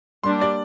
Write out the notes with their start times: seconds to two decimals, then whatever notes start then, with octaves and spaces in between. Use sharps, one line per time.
0.24 G3 A#3 D4 C6
0.41 D5